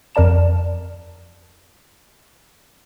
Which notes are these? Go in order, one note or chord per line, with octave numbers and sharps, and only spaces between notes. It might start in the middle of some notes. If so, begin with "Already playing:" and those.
F2 A#4 D5 A5 E7